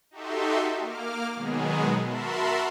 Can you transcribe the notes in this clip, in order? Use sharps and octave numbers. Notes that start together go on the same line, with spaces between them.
D#4 F#4 G4 A4 E5 C6
A#3 D6 F6
B2 D#3 F#3 G#3 B3 G#4
F#4 A#4 E5 A5 B5 C6